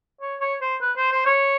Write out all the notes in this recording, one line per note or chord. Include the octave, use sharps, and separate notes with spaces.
C#5
C#5
C5
B4
C5
C5
C#5